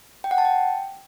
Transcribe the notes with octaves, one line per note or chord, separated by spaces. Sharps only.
G5
F#5
A5
G5